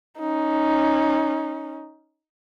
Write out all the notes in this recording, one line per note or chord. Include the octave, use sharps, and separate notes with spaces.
C#4 D#4